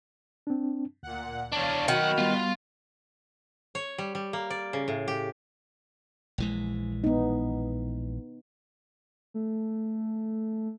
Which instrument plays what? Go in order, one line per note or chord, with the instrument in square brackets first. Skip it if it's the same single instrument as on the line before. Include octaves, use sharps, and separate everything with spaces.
[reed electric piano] C4 D4
[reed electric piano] D2 [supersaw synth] A#2 F#5
[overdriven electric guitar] E2 D4 [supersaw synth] C#5 F5
[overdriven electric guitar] B1 F#5 [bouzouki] D#3 [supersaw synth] F#4 B5
[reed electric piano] G3 B3 [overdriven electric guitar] F4
[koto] C#5
G3
G3
A#3
D5
C#3
A2
G4
[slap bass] A#1 E3 G#3
[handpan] B3 D#4
[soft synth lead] A3